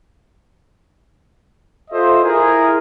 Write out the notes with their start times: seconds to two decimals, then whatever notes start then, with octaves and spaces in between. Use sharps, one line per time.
1.91 F4 A4 C5 D#5 E5
2.23 E4 G#4 A#4